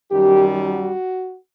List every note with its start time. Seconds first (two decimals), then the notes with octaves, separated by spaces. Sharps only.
0.11 F#2 D#3 G3 G4
0.63 F#4